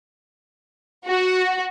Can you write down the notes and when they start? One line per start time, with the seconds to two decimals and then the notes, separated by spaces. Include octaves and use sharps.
1.07 F#4